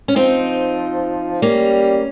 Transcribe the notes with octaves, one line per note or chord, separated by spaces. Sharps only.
C#4
F3 C4 D#4
G3 A#3 C#4